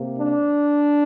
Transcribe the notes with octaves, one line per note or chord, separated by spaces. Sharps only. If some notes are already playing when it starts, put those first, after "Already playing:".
Already playing: C3 A#3
D4